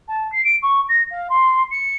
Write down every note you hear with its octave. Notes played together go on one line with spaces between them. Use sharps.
A5
C7
D7
C#6
A#6
F5
C6
C#7